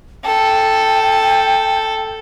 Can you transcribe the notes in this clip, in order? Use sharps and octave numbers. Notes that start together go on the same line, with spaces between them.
A4 G5